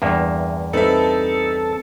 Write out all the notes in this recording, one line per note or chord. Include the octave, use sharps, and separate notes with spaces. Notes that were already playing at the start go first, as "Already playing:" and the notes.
E2 G2 A#3 E5
G3 C4 D#4 A4 B4 E5